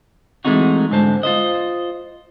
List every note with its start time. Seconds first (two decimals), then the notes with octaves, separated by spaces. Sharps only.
0.45 E3 G#3 A3 C4 D#4 F#4
0.91 G#2 D3 G#3 C5 A5
1.23 F4 C5 D#5